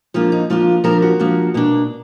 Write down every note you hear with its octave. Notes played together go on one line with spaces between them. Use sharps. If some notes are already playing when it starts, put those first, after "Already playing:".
F3 A#3 D4 F4
D#4
F3 A#3 D4 F4
F3 A#3 D4 A#4
F#4
F3 A#3 D4
B2 A#3 D4